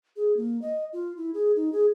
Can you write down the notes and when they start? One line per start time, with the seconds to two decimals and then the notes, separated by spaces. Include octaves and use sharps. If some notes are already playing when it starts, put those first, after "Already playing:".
0.16 G#4
0.37 A#3
0.62 D#5
0.93 F4
1.17 E4
1.34 G#4
1.56 D#4
1.72 G#4